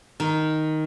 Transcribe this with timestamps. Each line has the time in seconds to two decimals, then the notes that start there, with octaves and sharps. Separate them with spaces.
0.20 D#3